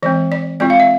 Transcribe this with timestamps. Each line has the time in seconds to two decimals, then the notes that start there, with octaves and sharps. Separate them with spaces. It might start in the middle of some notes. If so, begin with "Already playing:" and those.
0.03 E3 G#3 C4 D5
0.32 D5
0.60 G#3 C4 F4 D5
0.70 F5
0.80 E5